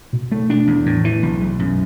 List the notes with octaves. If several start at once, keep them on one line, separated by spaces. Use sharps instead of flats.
B2
A3
D4
E2
A2
E3
B1
B1
F#2